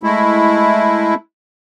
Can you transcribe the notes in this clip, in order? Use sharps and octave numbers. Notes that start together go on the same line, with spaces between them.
G#3 A3 E4